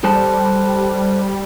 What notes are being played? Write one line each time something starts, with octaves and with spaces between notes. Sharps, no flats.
G3 A4 C5 A5